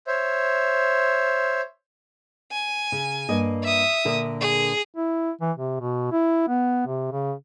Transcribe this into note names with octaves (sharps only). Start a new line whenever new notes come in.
C5 C#5 E5
G#5
C#3
G2 A#3 D#5
E5 D#6
A#2 D3 A#4
G#4
E4
E3
C3
B2
E4
B3
C3
C#3